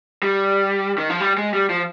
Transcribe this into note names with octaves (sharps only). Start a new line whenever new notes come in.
G3
D#3
F3
G3
G#3
G3
F3